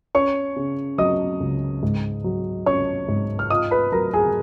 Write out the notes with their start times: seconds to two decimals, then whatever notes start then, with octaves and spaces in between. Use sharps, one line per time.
0.15 C#4 C#5 C#6
0.56 C#3
0.98 F#3 D#5 D#6
1.40 C#2
1.83 G#2
2.24 F#3
2.66 C#4 C#5 C#6
3.08 G#2
3.39 F6
3.50 F4 D#5 D#6
3.71 B4 B5
3.92 F#3 A#4 A#5
4.13 G#4 G#5